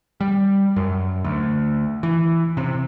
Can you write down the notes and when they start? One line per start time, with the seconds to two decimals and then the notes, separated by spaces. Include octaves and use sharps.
0.21 G3
0.76 F#2
1.24 D2
2.03 E3
2.57 C3